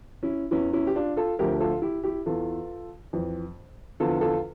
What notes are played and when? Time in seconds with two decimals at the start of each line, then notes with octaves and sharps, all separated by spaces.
0.23 C#4 E4
0.51 E2 E3 C#4 E4
0.73 C#4 E4
0.87 G4
0.95 D4 F4
1.16 F4 A4
1.39 D2 D3 F3 G4 A#4
1.60 F4 A4
1.82 E4 G4
2.03 E4 G4
2.26 E2 E3 F4 A4
3.13 F2 E3
4.00 E2 D3 F3 F4 A4
4.21 F4 A4